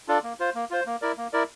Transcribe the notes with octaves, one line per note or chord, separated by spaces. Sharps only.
D4 F4 A4 D5
A#3
F4 C5
A#3
F4 C5
A#3
E4 A#4 D5
A#3
E4 A#4 D5